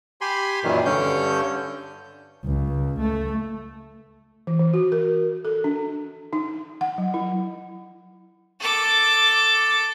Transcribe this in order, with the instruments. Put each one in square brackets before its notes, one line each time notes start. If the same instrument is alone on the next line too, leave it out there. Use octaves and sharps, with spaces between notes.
[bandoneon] G4 G#5 B5 C6
F#2 A#2 D#3 E3
G2 D3 C#4 G6
[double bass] C#2
A3
[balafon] E3
E3
F#4
A#4
A4
D4
D#4
F#5
F#3
E4
[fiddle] A4 D6